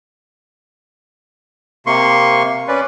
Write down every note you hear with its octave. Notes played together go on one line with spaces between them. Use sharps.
C3 A#3 C6 C#6
C#4 B4 D5